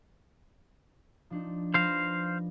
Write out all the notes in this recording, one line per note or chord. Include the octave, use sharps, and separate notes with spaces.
F3 D4 D#4
F3 B4 C5 F5 A#6